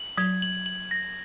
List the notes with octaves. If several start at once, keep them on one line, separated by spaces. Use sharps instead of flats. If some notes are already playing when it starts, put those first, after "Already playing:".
Already playing: F#7
F#3 G#6
F#7
F#7
A#6